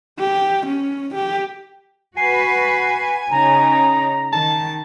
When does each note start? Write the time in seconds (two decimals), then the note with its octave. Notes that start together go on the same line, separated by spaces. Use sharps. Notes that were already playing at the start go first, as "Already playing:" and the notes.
0.20 G4
0.67 C#4
1.15 G4
2.17 F#4 B4 G#5 C7
3.31 C#3 D#4 A#5
4.32 D#3 A5